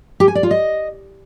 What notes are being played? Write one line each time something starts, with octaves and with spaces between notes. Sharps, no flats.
G4
G#5
D5
F4
D#5